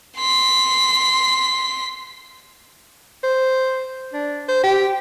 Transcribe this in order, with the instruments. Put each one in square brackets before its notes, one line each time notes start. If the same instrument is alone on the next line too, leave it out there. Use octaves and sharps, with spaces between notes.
[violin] C6 B6
[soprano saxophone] C5
D4
C5
G4